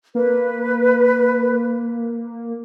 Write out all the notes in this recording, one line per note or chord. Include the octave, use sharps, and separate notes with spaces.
A#3 B4